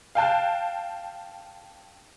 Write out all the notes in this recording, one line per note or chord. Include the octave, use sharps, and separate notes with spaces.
F5 G5 A5 F#6